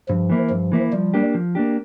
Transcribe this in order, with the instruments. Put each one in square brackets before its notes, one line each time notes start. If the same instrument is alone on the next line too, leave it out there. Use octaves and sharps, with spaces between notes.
[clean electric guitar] G2 [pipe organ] F3
[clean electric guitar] E3 A#3 E4
[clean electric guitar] G2 [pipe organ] F3
[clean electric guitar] E3 A#3 E4
[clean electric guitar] F3 [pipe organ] G3
[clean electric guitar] A#3 D4 G4
F3
A#3 D4 G4